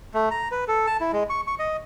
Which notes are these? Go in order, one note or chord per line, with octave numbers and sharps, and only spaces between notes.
A3
A#5
B4
A4
A5
E4
G#3
C#6
C#6
D#5